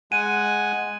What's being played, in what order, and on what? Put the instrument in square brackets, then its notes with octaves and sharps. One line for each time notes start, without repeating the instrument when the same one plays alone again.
[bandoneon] G#3 F#5 G#5 [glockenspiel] D#7